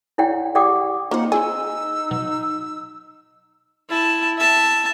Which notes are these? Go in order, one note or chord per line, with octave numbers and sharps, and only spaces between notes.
E4 C#5 D5 F#5 G5
G4 D5 F#5 G5 D6 D#6
A#3 C4 D#4 F4 C5 F#5
C4 E4 G#4 G#5 E6
B2 F#3
E4 A5
E5 A5